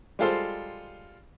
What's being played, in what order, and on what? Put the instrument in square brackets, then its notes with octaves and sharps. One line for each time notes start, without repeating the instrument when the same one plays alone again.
[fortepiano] G3 G#3 F4 A4 C5